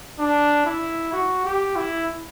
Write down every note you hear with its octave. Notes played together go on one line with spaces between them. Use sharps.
D4
E4
F#4
G4
E4